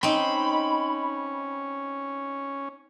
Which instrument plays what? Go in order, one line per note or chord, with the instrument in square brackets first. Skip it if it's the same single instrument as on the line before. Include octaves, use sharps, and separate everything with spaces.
[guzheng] C4 D#4 [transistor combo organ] C#4 [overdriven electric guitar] B5